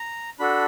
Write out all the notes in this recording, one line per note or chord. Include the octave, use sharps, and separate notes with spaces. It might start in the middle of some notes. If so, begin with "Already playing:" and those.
Already playing: A#5
D4 F#4 A4 B5